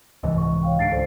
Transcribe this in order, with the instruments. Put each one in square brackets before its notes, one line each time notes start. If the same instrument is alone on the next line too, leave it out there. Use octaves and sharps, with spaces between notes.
[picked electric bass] C2 G#2 E3 [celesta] D#5
[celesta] C#6
C#5 F5 G5
[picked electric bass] G#2 D3 [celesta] A6 C7 D7
[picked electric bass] C#2 [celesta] A4 C5 D5